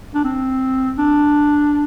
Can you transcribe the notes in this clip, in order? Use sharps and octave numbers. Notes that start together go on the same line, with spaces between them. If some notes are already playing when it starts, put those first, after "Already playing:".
D4
C4
D4